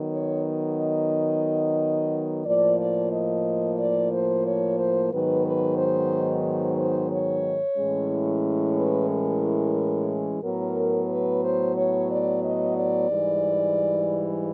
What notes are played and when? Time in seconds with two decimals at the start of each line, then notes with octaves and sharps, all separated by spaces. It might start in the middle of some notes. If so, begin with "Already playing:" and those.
Already playing: D#3 F#3 B3
0.12 C#5
0.79 D#5
2.46 A2 F3 A#3 D5
2.79 D5
3.12 D#5
3.79 D5
4.11 C5
4.45 C#5
4.79 C5
5.12 G#2 D#3 F#3 B3 B4
5.45 B4
5.78 C5
6.44 C5
6.77 C5
7.11 C#5
7.78 A2 E3 G#3 C#4
8.78 B4
9.10 A#4
10.43 A2 F#3 B3 A#4
11.10 B4
11.43 C5
11.77 C#5
12.10 D5
12.42 D#5
12.76 D5
13.10 G#2 E3 G3